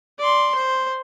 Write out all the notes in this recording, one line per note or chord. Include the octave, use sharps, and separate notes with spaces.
D5 C6
C5